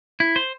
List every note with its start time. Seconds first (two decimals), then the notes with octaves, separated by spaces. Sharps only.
0.20 E4
0.36 C5